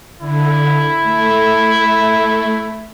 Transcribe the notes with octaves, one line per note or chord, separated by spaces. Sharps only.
D3 E4
A3